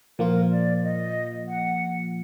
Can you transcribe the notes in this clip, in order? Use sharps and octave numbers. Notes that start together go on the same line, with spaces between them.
A#2 F3 A#3 F4 A#4
D5
D#5
F#5